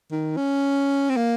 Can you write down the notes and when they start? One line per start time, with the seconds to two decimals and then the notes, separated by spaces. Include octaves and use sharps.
0.11 D#3
0.37 C#4
1.09 C4
1.17 A#3